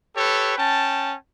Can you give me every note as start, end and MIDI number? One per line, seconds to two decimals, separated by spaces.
0.16 0.56 67
0.16 0.56 69
0.16 0.56 71
0.16 0.56 73
0.57 1.15 61
0.57 1.15 79
0.57 1.15 81